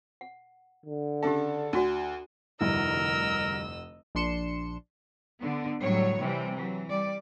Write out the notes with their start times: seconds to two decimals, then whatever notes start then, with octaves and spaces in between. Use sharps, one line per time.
0.21 F#5
0.86 D3
1.23 C#3 D4 G4 A4 E5
1.73 D2 D4 F#4 D5
2.61 F1 D2 G2 E4 A#4 D#5 E6
4.15 A#1 D4 C6 C#7 E7
5.41 D3 B3
5.80 A2 F#3 G3 C#5
6.18 C3 E3 G3
6.54 E3 F#3
6.89 G3 D5